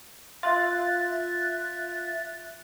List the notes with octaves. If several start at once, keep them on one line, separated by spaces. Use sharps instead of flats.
F4 E5 F#6 A6